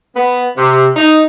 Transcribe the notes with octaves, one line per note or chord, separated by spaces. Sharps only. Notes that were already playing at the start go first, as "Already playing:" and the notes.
B3
C3
D#4